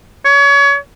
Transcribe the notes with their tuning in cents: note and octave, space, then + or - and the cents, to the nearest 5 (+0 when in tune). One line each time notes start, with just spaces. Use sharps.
C#5 +30